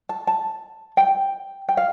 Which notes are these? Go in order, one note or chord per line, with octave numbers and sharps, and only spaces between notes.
A5
A5
G5
G5
F5